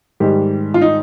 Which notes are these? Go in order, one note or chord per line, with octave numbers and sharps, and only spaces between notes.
G#2 D#3 G3 G4
F4
D#4